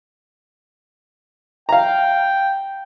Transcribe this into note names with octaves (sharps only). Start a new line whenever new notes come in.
F5 G5 A#5